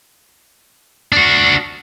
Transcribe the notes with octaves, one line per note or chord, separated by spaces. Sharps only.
D4 F#4